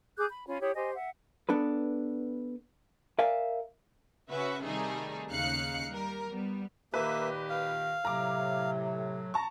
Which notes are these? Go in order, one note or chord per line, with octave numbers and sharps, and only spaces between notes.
G#4 D6 F#6 G6
B5
C#4 F4 B5
E4 G4 C#5 D#6
G4 C5 D#5 G#5
E5 F#5
B3 D4 A4 B4
A#4 D5 E5 F5 G#5
C#3 C#4 F#4 B4 E5
C3 D#3 G3 A3 D#4 G#4
D#2 C#3 D#4 F5 F#6 C#7
G3 A#4
G3 B3
A#2 D#3 A#3 G4 B4 E5
F5
A2 C3 F#3 A#5 D6
A5 A#5 C#6